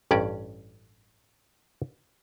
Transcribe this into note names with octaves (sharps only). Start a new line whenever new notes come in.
A1 G2 C#4 D5